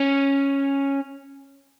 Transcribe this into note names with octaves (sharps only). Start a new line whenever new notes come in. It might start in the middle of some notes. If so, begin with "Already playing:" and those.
Already playing: C#4